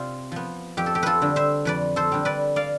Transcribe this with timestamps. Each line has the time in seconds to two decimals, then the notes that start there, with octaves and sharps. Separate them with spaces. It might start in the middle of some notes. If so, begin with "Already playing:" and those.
Already playing: C3 F4 D5
0.32 F3 B3
0.77 F2 G4
0.86 A4
0.95 G4
1.03 F4 A4 B4
1.22 D3 G3
1.36 C5 E5
1.65 F2 B4 D5
1.96 A4 C5
2.12 D3 G3
2.25 B4 D5
2.56 D5 F5